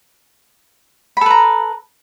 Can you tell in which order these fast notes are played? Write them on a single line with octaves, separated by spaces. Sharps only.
B5 A4 B4 A#5